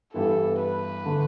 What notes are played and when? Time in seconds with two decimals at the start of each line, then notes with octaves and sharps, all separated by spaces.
0.14 G2 E3 B3 E4 G4 A4
0.60 B4
1.06 D3 A3